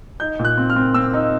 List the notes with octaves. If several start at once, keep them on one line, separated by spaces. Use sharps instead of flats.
D#4 G6
A#2
F#6
C4
F6
C4
C4 E6
D#4